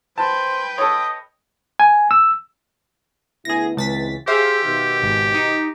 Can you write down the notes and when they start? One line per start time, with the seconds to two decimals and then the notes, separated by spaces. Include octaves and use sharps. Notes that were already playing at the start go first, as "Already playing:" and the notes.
0.18 B4 C5 G5 A5
0.78 A4 C#5 D#5 D#6
1.80 G#5
2.11 E6
3.45 D2 B3 E4 G#4 A#6
3.77 C#2 E3 C4 A6 B6
4.28 G4 G#4 C5 E5 F5
4.64 B2 D#3
5.02 G#1
5.34 D#4